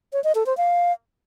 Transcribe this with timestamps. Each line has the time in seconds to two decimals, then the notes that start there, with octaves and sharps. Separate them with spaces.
0.13 C#5
0.24 D#5
0.35 A4
0.46 C5
0.57 F5